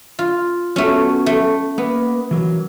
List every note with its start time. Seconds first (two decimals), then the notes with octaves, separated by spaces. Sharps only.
0.19 F4
0.76 F#3 A3 B3 C#4 F#4
1.26 A3
1.78 A#3 B3
2.31 E3 F#3 A#4